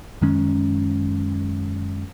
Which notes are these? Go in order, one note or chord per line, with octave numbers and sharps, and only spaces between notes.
F#2 D#3 G#3 C#4